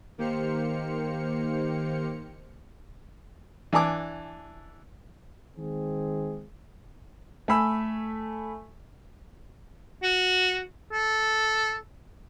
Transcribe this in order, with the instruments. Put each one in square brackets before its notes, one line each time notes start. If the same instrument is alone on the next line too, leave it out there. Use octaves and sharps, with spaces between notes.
[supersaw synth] D#3 A#3 G4 C5 F6 C#7
[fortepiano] E3 D4 G#5 A5 D6
[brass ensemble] D#3 G#3 C4 G#4
[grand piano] A3 G#5 B5 E6
[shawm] F#4
A4